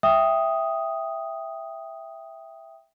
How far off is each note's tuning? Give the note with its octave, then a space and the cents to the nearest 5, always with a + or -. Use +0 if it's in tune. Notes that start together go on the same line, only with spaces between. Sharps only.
E5 +0 G5 +5 D#6 +0